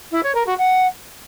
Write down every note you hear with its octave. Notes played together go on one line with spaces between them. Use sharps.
E4
C#5
A#4
F#4
F#5